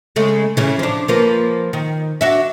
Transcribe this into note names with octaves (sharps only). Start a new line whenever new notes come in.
C#3 G#3 A3
A2 C#3 E3
F3 D4
F3 A#3 B4
D#3
D4 F#4 E5